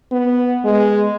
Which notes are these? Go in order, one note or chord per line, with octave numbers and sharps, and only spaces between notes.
B3
G#3